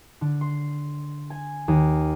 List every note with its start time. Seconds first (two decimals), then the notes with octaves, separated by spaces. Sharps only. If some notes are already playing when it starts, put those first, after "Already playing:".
0.21 D3
0.41 C6
1.30 G#5
1.68 D#2